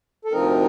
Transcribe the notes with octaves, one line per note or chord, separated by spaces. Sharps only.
A4
D2 C3 F3 C4 D#4 A#4